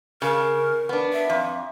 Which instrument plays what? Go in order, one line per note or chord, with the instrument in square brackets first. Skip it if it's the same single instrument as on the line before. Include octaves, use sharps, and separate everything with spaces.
[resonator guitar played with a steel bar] C#3 [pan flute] A#4
[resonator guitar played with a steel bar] B3 D4
[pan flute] E5
[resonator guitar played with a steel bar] F2